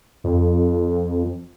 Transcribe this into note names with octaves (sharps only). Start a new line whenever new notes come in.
F2